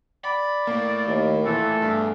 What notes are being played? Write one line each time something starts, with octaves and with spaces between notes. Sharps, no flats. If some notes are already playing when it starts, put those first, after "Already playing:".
D5 B5
A2 A#3
D#2
A#2 E3 A3 A4
E2 G2